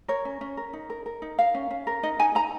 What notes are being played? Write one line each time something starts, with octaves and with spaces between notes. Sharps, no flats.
A#4 C#5
C#4
C#4
A#4
D#4
A#4
A#4
D#4
A#4 F5
C#4
C#4
A#4
D#4 D#5
D#4 G#5
D#4 A#5